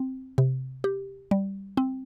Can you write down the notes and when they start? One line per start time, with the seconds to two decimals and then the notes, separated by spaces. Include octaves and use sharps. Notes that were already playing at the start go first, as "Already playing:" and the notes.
Already playing: C4
0.38 C3
0.84 G4
1.31 G3
1.77 C4